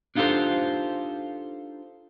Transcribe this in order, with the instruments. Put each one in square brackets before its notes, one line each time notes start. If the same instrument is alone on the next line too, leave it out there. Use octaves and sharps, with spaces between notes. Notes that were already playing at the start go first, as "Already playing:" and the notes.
[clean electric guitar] D4 D#4 F4 G4 A4 C5